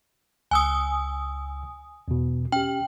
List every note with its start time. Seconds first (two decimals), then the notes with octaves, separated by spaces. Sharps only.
0.51 C#2 G#5 D#6 E6
2.08 E2 B2
2.52 C#4 G4 G5